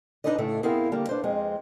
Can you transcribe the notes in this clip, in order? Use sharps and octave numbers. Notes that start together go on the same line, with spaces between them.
D4 D#4 A4 B4 D5 D#5
A2 C#3 A3
B3 C4 E4 G#4 A#4 F5
D3 G3 A#3
D4 B4 C5
F2 G#3 C4